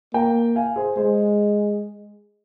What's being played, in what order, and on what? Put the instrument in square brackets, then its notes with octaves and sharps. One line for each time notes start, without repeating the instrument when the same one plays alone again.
[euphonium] A#3 [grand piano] G5 A#5
[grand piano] F5 G#5
G#4 C5
[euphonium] G#3 [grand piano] G#4 C5